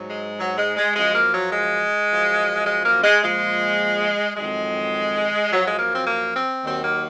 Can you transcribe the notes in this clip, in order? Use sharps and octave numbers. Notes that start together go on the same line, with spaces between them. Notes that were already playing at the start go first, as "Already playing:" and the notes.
Already playing: G#2 F#3
G#3
F#3
G#3
G#3
F#2 F3 G#3
A#3
F#3
G#3
F#2 F3
G#3
A#3
G#3
A#2 F3 G#3
F2 D#3 F#3 G#3
F#2 F3 F#3
G#3
A#3
C4
A#3
C4
D#2 D#3 F#3 C4
A#3